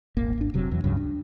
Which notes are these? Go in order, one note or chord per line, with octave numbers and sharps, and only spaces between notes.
D#1 G#1 A#3
G#1 D4
F1 C3 F#3
E2 E3 F#3
C#2 G2 C#3 F#3
D4